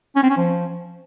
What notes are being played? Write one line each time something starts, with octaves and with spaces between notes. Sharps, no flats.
C#4
C4
C#4
F3